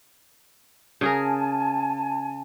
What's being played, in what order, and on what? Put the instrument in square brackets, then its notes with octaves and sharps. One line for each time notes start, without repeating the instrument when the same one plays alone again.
[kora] C#3 G#4 A#4 [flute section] G#5 A5